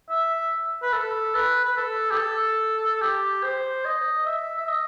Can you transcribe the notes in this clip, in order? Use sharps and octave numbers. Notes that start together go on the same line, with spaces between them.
E5
B4
A4
B4
B4
A4
G4
A4
G4
C5
D#5
E5
E5
D#5